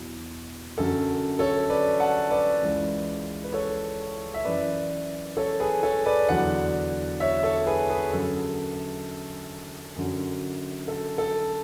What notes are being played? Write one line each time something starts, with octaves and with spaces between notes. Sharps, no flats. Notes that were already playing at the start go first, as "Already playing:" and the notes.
Already playing: E2 B2 F#3
F#2 D3 F#3 A4
A4 C#5
B4 D5
F#5 A5
B4 D5
C#2 C#3 E3
B4
A4 C#5
E5
F#2 E3 B4 D5
A4 C#5
G#4 B4
A4 C#5
B4 D5
E2 D3 F#3 D5 F#5
C#5 E5
A4 C#5
G#4 B4
G#4 B4
F#2 D3 F#3 A4
F#2 D3 F#3
A4
A4